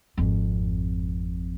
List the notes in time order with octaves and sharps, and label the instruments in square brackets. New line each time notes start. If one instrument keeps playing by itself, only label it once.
[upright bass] G#1 F2